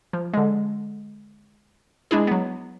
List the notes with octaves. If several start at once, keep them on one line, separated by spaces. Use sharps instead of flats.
F3
D3 G#3
G#3 D4 E4 G#4
F#3 B3